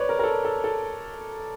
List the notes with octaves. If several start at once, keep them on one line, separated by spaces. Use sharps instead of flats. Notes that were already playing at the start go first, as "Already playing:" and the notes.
Already playing: B4 C#5 D5
A#4
A#4
A4
A4
A4